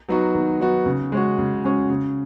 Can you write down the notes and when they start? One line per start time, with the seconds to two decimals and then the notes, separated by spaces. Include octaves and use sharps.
0.09 F#3 B3 D#4 F#4
0.35 D#3
0.60 F#3 B3 D#4 F#4
0.86 C#3
1.12 G#3 C#4 F#4
1.38 C#3
1.64 G#3 C#4 F#4
1.90 C#3